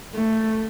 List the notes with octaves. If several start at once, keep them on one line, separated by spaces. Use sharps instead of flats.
A3